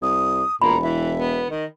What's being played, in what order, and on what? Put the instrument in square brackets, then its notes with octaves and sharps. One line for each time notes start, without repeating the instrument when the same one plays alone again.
[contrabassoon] C2 [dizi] D#6
[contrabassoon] E1 [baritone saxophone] A#2 [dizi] A#5 [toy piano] B5
[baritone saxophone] E3 [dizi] E5
[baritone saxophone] B3
[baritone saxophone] D#3 [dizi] D#5